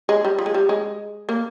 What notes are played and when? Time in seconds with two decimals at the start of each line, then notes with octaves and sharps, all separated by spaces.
0.09 G#3
0.25 G3
0.39 F3
0.46 G#3
0.54 G3
0.69 G#3
1.29 A#3